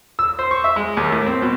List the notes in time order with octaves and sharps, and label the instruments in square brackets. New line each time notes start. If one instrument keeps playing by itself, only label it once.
[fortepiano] E6
C5
C#6
E5
G#3
D#2
A2
C4
B2